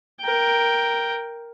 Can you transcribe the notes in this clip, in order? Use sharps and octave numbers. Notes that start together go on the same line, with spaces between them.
A#4 G5